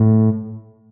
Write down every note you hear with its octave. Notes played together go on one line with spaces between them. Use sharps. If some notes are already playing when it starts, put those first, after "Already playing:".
Already playing: A2